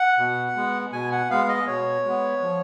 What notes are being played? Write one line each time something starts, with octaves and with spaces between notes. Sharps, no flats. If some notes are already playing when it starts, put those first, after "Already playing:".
Already playing: F#5
B2
G#3 B3
B2 G#5
F#5
G#3 B3 F5
D#5
B2 C#5
G#3 B3
F3